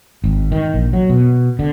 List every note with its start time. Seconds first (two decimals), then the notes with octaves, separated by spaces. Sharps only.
0.24 G#1
0.52 D#3
0.74 A#1
0.93 F#3
1.09 B2
1.59 D3